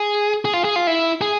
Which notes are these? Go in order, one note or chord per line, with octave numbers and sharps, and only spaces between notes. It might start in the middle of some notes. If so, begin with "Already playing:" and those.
Already playing: G#4
G#4
F4
G#4
F4
E4
G#4